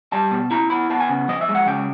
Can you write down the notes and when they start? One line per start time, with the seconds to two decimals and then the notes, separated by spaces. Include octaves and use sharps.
0.12 G3 A5
0.31 B2
0.51 E4 A#5
0.70 B3 B5
0.90 B3 A5
1.00 G#5
1.09 C#3
1.28 F3 D#5
1.41 E5
1.49 G#3
1.55 F#5
1.67 C#3 G5